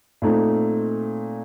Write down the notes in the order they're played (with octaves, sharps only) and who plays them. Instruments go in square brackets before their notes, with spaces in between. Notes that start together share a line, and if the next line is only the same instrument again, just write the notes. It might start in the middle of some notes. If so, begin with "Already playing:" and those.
[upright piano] A#2 A3 C4 D#4 A4